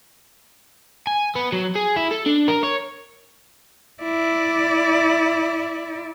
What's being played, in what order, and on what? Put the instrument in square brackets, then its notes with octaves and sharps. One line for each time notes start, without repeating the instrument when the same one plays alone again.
[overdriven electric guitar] G#5
B3
F#3
G#4
E4
A4
D4
A#4
C#5
[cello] E4 D5